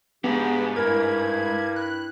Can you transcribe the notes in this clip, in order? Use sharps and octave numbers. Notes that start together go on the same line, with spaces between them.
G#2 C#3 B3 D4 G4
G2 E4 A#4 G#6
F#6